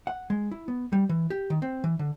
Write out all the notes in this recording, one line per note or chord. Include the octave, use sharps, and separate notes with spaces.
F#5
G#3
E4
B3
G3
E3
G4
D#3
C4
E3
D3